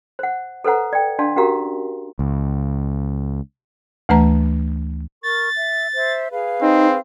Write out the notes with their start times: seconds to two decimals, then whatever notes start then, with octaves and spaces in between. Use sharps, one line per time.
0.19 C5 F#5
0.64 A4 B4 C5 F#5 A#5
0.93 D5 G5
1.19 D4 D5 F5 A5 C6
1.36 C#4 F#4 G4 A#4 F5 A#5
2.19 C#2
4.09 D2 E3 A3 B4 A#5
5.23 A#4 C#6 A6
5.56 E5
5.94 C5 E5
6.31 G#4 B4 F5
6.61 C4 D#4